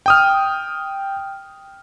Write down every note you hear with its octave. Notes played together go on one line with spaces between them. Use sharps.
G5 D#6 F6